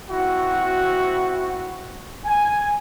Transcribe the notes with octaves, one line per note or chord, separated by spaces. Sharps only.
C4 E4 F#4
G#5